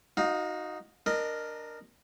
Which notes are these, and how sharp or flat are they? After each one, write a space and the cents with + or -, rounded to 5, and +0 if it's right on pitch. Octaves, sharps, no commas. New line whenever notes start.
D#4 +0 F#4 -10 F5 +25
D4 +0 A#4 +0 D#5 -25